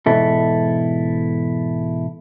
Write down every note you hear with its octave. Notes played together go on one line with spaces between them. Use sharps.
E2 G#2 B2 E4 A4